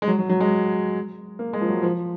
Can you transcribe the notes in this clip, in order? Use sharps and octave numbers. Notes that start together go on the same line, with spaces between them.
G#3
F#3
F#3
F#3
G#3
A#3
G#3
F3
F#3
F3